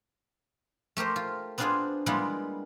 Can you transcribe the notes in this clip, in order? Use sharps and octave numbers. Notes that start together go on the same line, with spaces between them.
A3 G4 A#4 C5
F4
B3 C4 D4 F4 G#4 C5
G3 G#3 A#3 B3 E4 F4